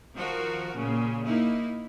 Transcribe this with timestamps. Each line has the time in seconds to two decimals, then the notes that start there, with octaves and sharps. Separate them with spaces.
0.15 D#3 F3 F#4 A#4
0.72 A#2 C#3
1.26 A#3 D#4 E4